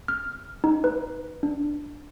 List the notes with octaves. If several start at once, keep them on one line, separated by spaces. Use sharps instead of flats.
F6
D#4
B4
D4